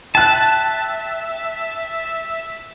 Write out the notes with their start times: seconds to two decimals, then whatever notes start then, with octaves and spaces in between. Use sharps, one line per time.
0.15 E5 G5 A5 F#6